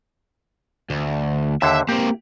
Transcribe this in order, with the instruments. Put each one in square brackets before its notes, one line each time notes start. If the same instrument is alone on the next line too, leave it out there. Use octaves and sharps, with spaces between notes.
[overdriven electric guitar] D2
[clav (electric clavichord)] D#2 D3 [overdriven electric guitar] E5
[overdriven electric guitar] A#3 C4 [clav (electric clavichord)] G4